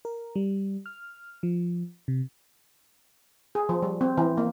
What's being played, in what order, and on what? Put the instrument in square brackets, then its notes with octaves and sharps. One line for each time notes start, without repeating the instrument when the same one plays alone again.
[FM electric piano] A#4
G3
F6
F3
C3
[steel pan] G#4
F3
G3
C4
E3
A#3